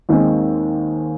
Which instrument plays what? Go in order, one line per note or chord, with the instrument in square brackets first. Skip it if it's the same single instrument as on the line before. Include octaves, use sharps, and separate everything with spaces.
[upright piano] D#2 D#3 G#3 C4